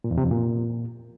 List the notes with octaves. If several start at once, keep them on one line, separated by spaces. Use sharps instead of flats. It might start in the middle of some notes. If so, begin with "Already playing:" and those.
A#2
E2
C3
F2
A#2